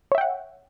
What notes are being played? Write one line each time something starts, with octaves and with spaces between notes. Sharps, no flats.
C#5 E5 F#5 G5